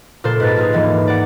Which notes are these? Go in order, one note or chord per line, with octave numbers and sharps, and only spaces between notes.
A#2 A4 C5
G#2 B4 F#6 A6
A#3 F4 G#4
D#2 G#2 E3
D5 F#5